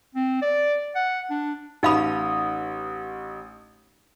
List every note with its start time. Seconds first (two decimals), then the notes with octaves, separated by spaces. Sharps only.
0.15 C4
0.42 D5
0.95 F#5
1.30 D4
1.83 A1 D#4 F5 B5 D#6